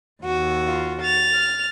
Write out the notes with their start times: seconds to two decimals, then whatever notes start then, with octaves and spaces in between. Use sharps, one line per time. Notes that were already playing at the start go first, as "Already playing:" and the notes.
0.22 D#2 F#4
0.67 F4
1.01 A6 F7
1.33 F6